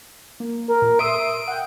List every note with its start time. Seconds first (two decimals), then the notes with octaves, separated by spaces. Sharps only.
0.40 A#3
0.68 A#4
0.82 A#2
0.99 E5 C6 D#6 D7
1.48 F#5 G5